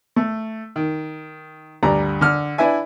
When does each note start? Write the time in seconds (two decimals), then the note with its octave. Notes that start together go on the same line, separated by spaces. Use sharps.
0.16 A3
0.76 D#3
1.83 D2 G2 G3 D4 A#5
2.21 D3 F6
2.58 D4 E4 B4 E5 G#5